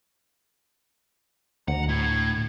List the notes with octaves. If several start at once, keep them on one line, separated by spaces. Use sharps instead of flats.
D2 F#5 A#5
A2 G#6